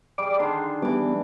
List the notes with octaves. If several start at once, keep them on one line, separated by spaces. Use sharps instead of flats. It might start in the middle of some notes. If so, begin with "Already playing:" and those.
G3 G#4 D5 D6
D3 D#3 D4 C6
E3 G3 B3 D6